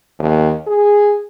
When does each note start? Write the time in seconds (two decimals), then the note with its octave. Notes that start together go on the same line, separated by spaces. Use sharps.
0.19 D#2
0.67 G#4